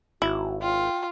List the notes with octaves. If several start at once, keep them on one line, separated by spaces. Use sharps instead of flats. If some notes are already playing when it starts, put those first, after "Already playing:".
G#1 E4 F#4
F4 G5